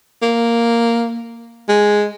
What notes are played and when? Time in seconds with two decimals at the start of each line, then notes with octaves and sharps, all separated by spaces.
0.22 A#3
1.69 G#3